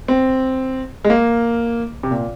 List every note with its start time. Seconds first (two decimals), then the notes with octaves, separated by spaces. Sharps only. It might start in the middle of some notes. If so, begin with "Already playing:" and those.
0.08 C4
1.05 G#3
1.10 A#3
2.03 C3
2.11 A#2